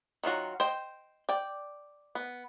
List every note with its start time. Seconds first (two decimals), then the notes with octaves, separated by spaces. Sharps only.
0.23 D#3 F#3 F4 F#4
0.60 C5 D#5 G5
1.29 D5 G5
2.15 B3